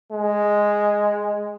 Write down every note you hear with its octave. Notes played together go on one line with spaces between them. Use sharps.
G#3